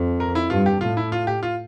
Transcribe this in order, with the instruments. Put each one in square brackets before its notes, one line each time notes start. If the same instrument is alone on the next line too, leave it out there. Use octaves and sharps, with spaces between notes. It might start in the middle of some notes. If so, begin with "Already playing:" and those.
Already playing: [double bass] F2
[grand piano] A#4
E4
[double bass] G2 [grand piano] F4
[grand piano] G4
[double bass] A2 [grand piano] F4
[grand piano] E4
F4
G4
F4